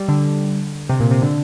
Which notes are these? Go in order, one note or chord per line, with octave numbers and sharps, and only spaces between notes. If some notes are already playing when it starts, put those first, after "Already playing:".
Already playing: G3
D3
C3
A#2
C3
D3